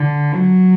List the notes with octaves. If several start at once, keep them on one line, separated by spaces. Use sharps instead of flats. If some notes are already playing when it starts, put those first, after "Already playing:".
Already playing: D3
F#3